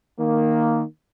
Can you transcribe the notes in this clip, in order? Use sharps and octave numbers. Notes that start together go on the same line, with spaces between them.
D#3 A#3